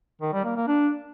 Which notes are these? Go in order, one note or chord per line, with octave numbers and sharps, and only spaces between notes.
D#3
G3
A#3
A#3
D4